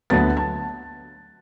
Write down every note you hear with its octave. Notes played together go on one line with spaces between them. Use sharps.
D2 D3 F#3 B3 A5 A6
A5 A6